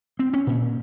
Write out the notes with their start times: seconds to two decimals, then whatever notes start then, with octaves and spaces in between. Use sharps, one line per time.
0.19 C4
0.34 C#4
0.47 A#2